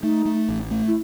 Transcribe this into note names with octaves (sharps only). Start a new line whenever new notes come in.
A3 D#4
A3
A1
A3
E4